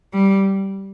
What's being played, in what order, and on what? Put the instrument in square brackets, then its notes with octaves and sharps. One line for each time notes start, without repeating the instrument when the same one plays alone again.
[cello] G3